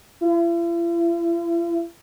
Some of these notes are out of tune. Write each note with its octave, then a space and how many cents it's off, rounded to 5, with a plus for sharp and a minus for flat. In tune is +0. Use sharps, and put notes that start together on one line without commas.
E4 +45